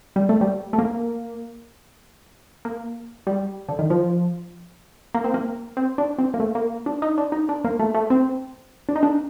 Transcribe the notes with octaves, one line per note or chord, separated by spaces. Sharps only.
G3
A3
G3
A3
A#3
A#3
G3
D3
D#3
F3
A#3
C4
A#3
C4
D4
C4
A#3
A3
A#3
D4
D#4
D4
D#4
D4
A#3
A3
A3
C4
D4
D#4
D4